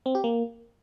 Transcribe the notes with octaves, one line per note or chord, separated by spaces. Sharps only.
C4
G4
A#3